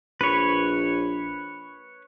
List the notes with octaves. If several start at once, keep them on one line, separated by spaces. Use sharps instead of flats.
A#1 B4 C#5